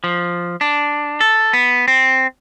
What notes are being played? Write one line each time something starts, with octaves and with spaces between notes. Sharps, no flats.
F3
D4
A4
B3
C4